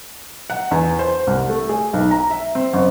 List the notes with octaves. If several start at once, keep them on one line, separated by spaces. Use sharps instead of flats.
F#5
E2
C5
C2
A3
G#4
B1
A#5
E5
C4
F#1